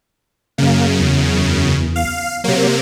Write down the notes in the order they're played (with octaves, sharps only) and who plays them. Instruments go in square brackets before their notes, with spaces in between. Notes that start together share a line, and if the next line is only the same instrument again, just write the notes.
[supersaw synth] F#2 C#3 [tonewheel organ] A#3
[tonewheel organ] E2
[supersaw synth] F5
[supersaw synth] C3 A#3 [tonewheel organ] F#3